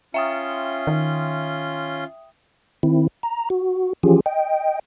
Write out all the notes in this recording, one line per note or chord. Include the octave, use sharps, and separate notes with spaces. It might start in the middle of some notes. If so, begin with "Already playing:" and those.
C#4 F4 E5 G5 C6 D#6
D#3
D#3 C4 E4
A#5
F#4
E3 F3 C#4 F4 G4 G#4
D#5 G5